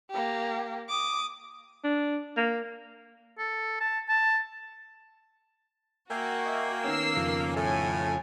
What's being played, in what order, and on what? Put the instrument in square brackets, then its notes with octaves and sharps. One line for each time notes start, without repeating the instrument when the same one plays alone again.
[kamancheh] A#3 G4
D6 D#6
[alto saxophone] D4
A#3
[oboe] A4
A5
A5
[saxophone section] A#3 [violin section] F#4 [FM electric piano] E5 [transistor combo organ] G5 G#5
[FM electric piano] D#5 E5
[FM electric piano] D#3 B3 C#4 [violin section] E6 C7
[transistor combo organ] F2 C#3 F3
[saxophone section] A2 [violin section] G#5